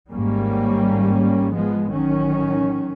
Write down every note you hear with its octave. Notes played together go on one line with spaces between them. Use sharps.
G#1 G#2 G3 A#3 C#4
F3 G#3 B3
A1 D#3 F#3 C#4